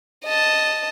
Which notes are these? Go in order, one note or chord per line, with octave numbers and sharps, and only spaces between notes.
D#5 A5